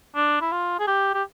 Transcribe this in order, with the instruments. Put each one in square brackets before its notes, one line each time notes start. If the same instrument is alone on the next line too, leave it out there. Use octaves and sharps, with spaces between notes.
[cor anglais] D4
E4
F4
G#4
G4
G4